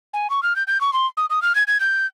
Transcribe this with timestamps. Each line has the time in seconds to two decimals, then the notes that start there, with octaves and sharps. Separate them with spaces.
0.13 G#5
0.30 C#6
0.43 F6
0.56 G6
0.67 G6
0.81 C#6
0.93 C6
1.17 D#6
1.30 D#6
1.42 F6
1.55 G#6
1.67 G#6
1.80 G6